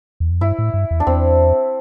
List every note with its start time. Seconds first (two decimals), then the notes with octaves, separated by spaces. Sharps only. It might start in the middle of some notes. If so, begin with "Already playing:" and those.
0.20 E2
0.31 F2
0.41 G2 E4
0.59 A2
0.74 G2
0.91 E2
1.00 D4
1.07 E2 C4